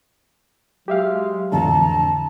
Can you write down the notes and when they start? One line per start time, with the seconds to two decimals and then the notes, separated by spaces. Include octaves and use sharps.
0.88 F#3 G#3 G4 E5 F5
1.52 F2 A2 D3 E3 D4 A5 A#5